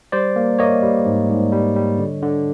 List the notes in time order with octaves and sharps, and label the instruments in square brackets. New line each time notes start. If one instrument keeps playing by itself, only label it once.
[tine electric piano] G3 C5 D5
A#3
A#3 C#5 D#5
G3
G#2
G#2
G3
G3
D3
D3